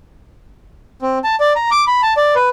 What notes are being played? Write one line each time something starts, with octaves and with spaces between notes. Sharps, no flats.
C4
A5
D5
A#5
D6
B5
A5
D5
B4